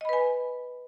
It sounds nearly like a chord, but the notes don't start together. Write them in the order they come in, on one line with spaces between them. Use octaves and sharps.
D#5 B5 B4 G#5